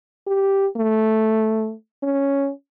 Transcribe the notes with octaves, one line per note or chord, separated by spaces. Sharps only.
G4
A3
C#4